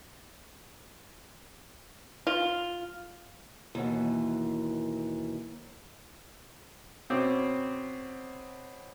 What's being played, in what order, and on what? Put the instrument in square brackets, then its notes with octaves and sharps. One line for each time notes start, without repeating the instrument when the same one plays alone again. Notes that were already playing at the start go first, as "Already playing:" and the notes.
[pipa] F4
[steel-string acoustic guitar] D#2 B2 E3
[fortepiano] B2 C4 C#4 D6